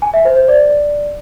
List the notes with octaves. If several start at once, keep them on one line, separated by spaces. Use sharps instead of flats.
G#5
E5
C5
C5
D5